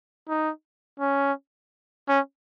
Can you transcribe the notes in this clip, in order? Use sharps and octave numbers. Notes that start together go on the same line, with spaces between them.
D#4
C#4
C#4